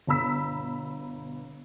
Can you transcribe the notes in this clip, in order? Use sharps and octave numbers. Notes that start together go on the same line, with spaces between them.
G1 B2 A#5 B5 E6 B6